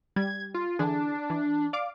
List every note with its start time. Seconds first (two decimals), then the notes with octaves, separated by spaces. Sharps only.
0.16 G3 G#6
0.54 F4
0.79 D3 E3 D4 G#4
1.30 E3
1.73 D5 F5 D6